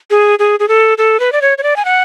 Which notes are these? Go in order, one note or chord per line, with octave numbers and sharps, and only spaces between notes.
G#4
G#4
G#4
A4
A4
B4
D5
C#5
C#5
D5
G#5
F#5